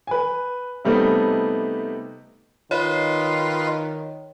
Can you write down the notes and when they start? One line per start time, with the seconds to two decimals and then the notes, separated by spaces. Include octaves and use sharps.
0.07 B4 G#5
0.85 C3 G3 A3 B3 D#4
2.71 D#3 F4 B4 C#5 D#5 C6